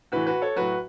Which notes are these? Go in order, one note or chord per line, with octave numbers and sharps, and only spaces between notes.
A2 E3 F#4 B4
F#4 B4
A4 C#5
A2 F#3 F#4 B4